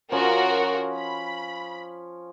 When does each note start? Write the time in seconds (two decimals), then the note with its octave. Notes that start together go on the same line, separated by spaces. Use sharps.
0.12 F3 C#4 F4 F#4 A#4
0.94 B5